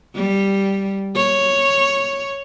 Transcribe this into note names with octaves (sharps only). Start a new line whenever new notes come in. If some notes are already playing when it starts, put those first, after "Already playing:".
G3
C#5